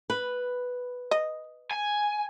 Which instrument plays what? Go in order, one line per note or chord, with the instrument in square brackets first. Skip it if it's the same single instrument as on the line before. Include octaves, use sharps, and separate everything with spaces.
[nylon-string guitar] B4
[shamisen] D#5
[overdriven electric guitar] G#5